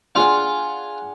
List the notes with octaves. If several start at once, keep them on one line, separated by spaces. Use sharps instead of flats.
D4 F4 G#4 F5 F#5